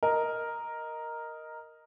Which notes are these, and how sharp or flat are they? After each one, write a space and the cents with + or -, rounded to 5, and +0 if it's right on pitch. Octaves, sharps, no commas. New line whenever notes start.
A#4 +0 D#5 +0